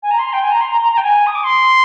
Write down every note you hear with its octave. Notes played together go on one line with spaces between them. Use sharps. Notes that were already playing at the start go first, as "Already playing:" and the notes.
G#5
A#5
C6
G5
G#5
A#5
C6
A#5
A#5
A#5
G5
G#5
D#6
D6
C6